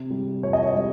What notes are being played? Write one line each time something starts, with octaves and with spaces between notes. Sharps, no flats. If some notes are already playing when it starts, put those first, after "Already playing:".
Already playing: C3
G3
F2 C#5
D#5
C#5
G3